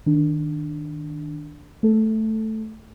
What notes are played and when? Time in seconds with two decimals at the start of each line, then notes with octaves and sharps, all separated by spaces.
0.06 D#3 D4
1.83 A3 A4